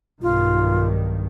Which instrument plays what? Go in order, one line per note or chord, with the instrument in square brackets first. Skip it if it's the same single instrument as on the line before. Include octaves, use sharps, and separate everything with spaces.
[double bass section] B1 G2 D#3 [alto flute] F4